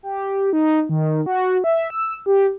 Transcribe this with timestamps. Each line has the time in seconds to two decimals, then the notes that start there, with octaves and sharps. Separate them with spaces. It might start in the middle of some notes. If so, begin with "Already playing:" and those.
0.03 G4
0.53 D#4
0.89 D#3
1.26 F#4
1.64 E5
1.90 E6
2.26 G4